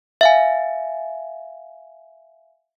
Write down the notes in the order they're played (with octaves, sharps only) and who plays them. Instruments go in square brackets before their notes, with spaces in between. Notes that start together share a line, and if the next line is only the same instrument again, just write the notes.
[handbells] E5 F5 G#5